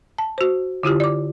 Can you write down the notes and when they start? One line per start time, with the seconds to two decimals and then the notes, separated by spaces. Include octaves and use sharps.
0.18 A5
0.38 F#4 C5
0.83 D3 E4 F4 G4
1.00 D5 D6